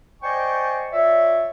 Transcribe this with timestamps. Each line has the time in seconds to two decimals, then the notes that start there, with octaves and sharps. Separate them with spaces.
0.22 C5 D5 D#5 G5 G#5 C#6
0.92 F4 C#5 D5 E5